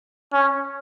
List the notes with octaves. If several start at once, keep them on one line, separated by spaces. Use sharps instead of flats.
C#4